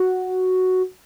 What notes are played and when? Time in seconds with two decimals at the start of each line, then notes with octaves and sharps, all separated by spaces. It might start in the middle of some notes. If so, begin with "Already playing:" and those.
Already playing: F#4